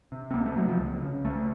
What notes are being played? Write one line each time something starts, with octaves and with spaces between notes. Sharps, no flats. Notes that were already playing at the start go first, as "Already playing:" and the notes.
C3
C4
C#2 A#3
A3
C3 F#3
F3
C#2
C#3
C#2 A3